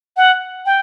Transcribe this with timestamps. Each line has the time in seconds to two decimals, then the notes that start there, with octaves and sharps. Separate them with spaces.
0.17 F#5
0.66 G5